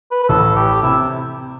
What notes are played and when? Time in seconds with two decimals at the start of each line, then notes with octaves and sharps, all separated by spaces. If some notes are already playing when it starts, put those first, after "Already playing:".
0.11 B4
0.23 B4
0.29 A1 A2 A4
0.56 G4
0.83 C3 E4